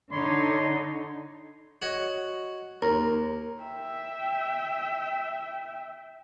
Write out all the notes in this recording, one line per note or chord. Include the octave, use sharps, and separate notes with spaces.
D3 D#4 C#5 B5 C6
F#4 C#5 D#5
D#2 A#4
E5 G5